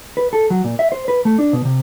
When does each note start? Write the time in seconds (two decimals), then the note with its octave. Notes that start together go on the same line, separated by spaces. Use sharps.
0.17 B4
0.33 A4
0.50 F#3
0.64 A#2
0.79 E5
0.92 C5
1.08 B4
1.25 A3
1.38 D4
1.53 B2
1.65 C3